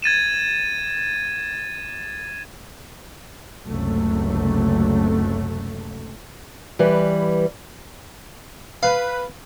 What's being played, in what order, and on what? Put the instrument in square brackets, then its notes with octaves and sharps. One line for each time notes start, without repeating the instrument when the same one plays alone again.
[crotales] G#6 A6 D#7 E7
[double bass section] F#1 C#2 C3 F#3 A3
[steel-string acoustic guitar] E3 G3 B4
[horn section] B4 [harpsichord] F5